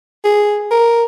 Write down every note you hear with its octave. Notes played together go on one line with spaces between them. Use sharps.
G#4
A#4